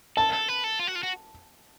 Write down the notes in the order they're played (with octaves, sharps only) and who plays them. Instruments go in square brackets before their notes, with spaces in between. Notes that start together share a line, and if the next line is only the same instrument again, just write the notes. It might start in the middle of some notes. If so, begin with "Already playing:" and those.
[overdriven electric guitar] A4 [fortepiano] A5
[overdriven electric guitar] A4
B4
A4
F4
F#4
F4
F#4